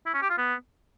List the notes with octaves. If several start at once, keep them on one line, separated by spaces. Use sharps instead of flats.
E4
C#4
G4
F4
B3